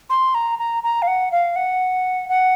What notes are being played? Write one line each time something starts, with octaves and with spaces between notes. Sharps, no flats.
C6
A#5
A#5
A#5
F5
F#5
F5
F#5
F#5